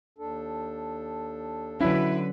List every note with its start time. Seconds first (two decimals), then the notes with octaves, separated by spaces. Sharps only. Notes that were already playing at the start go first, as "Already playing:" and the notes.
0.18 D#2 D4 A4
1.81 B2 D3 F#3 C#4 E4 B4